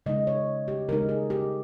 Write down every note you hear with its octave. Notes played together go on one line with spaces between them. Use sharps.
C#3 G#3 D#4 D#5
C#5
G4
C#3 G#3 D#4 A#4
G#4
G4